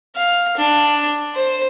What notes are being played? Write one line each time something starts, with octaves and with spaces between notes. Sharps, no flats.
F5
D4
C5